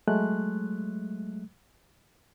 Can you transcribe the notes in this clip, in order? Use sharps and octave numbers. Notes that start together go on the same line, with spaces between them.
F#3 G#3 A3 F#6